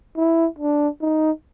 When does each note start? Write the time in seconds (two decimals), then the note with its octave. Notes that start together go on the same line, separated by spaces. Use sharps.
0.17 E4
0.59 D4
1.01 D#4